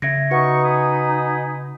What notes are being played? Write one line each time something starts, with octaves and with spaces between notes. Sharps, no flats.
C#3 E5 G#6 A#6
D#4 F#4 B4 F#5 C#6
G#5 B5 D#6